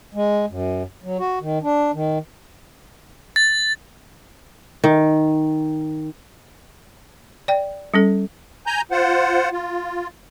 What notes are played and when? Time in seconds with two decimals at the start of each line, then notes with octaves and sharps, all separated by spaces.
0.14 G#3
0.50 F#2
1.03 F#3
1.19 F#4
1.41 D#3
1.62 D4
1.93 D#3
3.36 A6
4.84 D#3
7.48 D5 G5
7.94 G3 C#4 A4
8.66 G#5 A#5 G6
8.91 F4 C5 F#5
9.52 F4